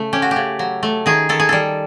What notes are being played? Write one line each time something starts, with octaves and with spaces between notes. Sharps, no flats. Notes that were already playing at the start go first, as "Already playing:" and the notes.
Already playing: C#3 A3
C#4 G4
F#4
G4
C#3
F#3
A3
D#3 G#4
D#3 A4
G#4
G3 A4